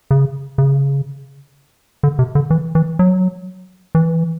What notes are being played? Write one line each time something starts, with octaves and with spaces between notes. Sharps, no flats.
C#3
C#3
D3
C3
D3
E3
E3
F#3
E3